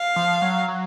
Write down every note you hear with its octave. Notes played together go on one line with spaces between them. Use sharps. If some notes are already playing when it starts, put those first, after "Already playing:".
Already playing: F5
F3
F#3
F#3